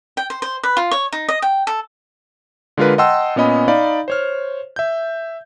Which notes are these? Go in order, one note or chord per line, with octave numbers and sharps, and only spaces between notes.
G5
C5
C5
B4
F4
C#5
D#4
D#5
G5
A4
D3 G#3 F4 A#4 B4
D#5 F#5 G5 A5 C6 E6
A#2 B3 C#4 D#5 B5
D#4 D5 F5 B5
C5 C#5 F6
E5 G6